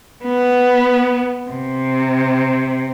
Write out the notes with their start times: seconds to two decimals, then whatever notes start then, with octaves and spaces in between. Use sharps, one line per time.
0.25 B3
1.50 C3